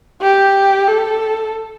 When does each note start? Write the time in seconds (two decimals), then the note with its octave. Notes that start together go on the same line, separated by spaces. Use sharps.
0.22 G4
0.88 A4